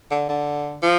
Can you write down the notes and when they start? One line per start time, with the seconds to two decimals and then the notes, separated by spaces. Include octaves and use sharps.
0.11 D3
0.29 D3
0.82 F3